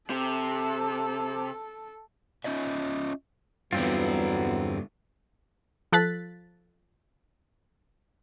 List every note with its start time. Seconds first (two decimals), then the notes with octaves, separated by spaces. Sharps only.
0.10 C3 A4
2.44 C#4 F4 D#5 E5
3.73 E2 G2 D3 F#3 B3 C4 E4 F4
5.93 F3 A4 F#6 A6 B6